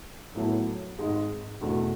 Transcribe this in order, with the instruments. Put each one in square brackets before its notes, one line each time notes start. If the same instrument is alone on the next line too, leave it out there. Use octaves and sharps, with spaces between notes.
[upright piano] A2 F#3 B3 E4 A4
G#1 G#2 G#3
E2 B2 A3 D4 F#4